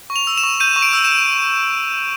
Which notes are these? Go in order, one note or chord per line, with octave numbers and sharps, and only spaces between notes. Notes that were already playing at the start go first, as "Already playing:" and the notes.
C#6
F7
E6
E7
C#6
G6 D#7
C#6
D7
E6
E7